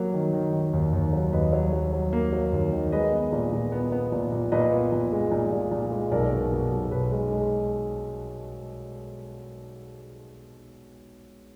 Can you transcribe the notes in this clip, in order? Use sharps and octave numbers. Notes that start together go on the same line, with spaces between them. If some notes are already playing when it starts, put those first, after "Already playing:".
Already playing: F#3 A#3 A#4
D#3
D#3
D#3
D#2
D#2
F#3
D#2 B4 D#5
F#3
F#3
F#3
A#3
F#3
D#2
D#3
G#3 B4 D#5
B3
A#2
A#2
B3
B3
A#2
A#2
A#2 B4 D#5
B3
A#2
G#3
A#2
A#2
A#2
G#3
B1 A#4 D5
B2
B2
B1
B1 B4
G#3
G#3